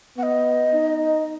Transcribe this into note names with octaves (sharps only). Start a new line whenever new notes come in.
B3 F#5
D#5
D#4